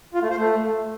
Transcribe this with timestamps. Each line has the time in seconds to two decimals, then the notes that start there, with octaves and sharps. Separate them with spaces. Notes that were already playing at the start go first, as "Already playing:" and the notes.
0.14 F4
0.22 A3
0.30 C5
0.38 A3